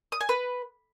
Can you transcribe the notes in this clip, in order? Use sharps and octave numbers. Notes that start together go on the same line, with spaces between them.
D#6
G#5
B4